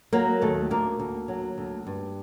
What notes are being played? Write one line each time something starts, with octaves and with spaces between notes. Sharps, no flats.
F#3 A#3
D#2 A3
D2 A#3
D2
F#3
D2
G2